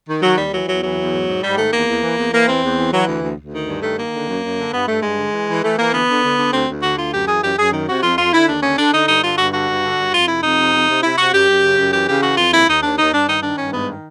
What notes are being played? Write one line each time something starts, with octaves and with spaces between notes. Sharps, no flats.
D#3
D#3 F#3
D#2 G3
E3 F#3
E2 F#3
E3 F#3
E2
G#2
G#2
G#2 G3
D#3 A3
E2 A#3
E2
E3
E2
E3 A#3
E2 C4
E2
E3
E3 F#3
D2
D2
D2
D#3
G2
D#3 A3
D#3 A#3
D3
F#2
F#2
D3
G2 B3
G2 A3
G2 G#3
D3
E3
E3
E3 A3
E3 A#3
D3 B3
D3
D3
D3
D2 C4
D2
D3 F#4
D2 F4
F#2 G4
E3 G#4
F#2 G4
F#2 G#4
D#3
C3 F#4
F2 F4
F2 F4
D3 E4
D#2 D4
D3 C#4
D3 D4
D3 D#4
G2 D#4
D3 F4
G2 F#4
D3 F#4
G2
D3
G2
F2 F4
C3 E4
F2 D#4
C3
F2
C3
C3 E4
C3 F#4
F#2 G4
F#2
C#3
F#2
E3 G4
C#3 G4
E3 F#4
F2 F4
D#2 E4
D#2 D#4
D#2 D4
D#2 D#4
G2 D4
D#3 D#4
D#3 D4
G2 C#4
G#2 B3
D#3